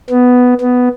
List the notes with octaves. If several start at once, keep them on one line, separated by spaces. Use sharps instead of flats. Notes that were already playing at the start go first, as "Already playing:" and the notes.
B3
B3